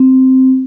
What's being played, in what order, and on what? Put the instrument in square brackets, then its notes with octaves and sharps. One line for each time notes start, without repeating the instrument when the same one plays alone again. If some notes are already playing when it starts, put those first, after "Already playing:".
Already playing: [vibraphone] C4